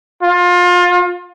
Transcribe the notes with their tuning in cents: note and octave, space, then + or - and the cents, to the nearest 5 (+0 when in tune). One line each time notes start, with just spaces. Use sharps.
F4 +25